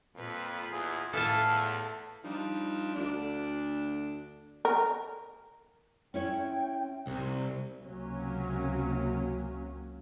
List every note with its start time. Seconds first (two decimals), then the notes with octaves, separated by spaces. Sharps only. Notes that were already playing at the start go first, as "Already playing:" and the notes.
0.15 F2 A#2 F4 B4
0.71 E2 G#4
1.13 A2 E3 A4 E5 F5 A5
1.48 E2
2.24 F3 G3 D4 D#4
2.95 D2 D4
4.65 A#4
6.14 C#4 E4 C#5 G5
7.07 C2
7.85 C#2 C3 F#3 A#3 C#4